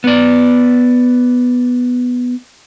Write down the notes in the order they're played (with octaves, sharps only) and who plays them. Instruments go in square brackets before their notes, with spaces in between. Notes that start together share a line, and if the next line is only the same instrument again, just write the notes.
[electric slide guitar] B3 D5